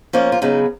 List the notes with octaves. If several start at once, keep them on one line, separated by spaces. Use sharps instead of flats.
F3 A#3 C#4
F4
C#3 F#3 B3 D#4